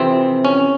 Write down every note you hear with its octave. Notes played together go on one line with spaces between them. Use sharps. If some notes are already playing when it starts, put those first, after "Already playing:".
Already playing: F2 C3 E3 C4
C#4